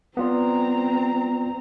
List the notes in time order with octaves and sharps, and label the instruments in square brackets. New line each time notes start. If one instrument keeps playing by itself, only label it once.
[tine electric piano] B3 F4 D5 [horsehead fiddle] C4 A#5